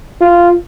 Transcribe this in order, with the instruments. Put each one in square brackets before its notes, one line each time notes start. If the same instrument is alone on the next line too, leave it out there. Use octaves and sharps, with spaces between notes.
[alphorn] F4